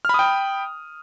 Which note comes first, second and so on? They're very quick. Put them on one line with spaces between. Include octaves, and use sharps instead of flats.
F6 B5 D#6 G5